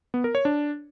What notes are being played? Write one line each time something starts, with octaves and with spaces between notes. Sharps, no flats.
B3
A#4
C#5
D4